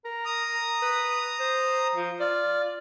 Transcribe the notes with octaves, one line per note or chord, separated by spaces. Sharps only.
A#4
A#5 D#6
B4
C5
F3
F4 D5